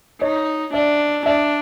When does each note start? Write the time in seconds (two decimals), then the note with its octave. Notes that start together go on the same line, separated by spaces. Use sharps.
0.21 D#4 C#5 D#5
0.73 D4 D5 E5
1.26 D4 D5 E5